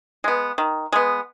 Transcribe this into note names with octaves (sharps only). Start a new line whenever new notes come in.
G#3 B3
D#3
G#3 B3